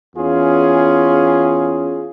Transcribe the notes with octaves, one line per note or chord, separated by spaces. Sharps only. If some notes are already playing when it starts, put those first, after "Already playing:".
E2 C#4 F4 G#4